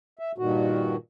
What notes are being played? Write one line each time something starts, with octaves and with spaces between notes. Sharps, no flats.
E5
G2 A#2 D#3 F#4